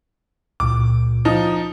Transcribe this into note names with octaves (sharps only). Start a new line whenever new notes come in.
C#2 A#2 D6
F3 D#4 A#5 D#6